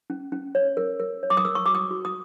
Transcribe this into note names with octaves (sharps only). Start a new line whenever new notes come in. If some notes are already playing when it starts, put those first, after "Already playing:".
C#4
C#4
C#5
A#4
A#4
C#5
D6
D#6
A#4 E6
C#6
F#4 D6
D#6
F#4
D#6